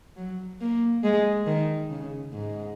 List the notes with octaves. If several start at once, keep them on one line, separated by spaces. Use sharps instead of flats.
F#3
A#3
G#3
D#3
C#3
G#2